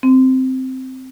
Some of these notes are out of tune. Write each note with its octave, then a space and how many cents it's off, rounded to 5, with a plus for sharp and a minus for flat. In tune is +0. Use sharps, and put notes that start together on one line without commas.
C4 -5